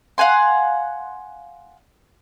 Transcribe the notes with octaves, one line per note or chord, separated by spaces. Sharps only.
F5 F#5 G#5 C6